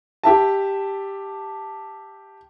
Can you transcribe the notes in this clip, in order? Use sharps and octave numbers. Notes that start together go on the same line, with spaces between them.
G4 E5 A5